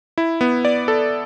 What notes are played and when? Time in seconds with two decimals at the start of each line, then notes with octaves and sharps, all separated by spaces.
0.18 E4
0.41 B3
0.65 D5
0.88 A4